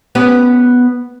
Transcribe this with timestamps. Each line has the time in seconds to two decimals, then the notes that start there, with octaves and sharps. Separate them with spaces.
0.15 B3 C#4 G4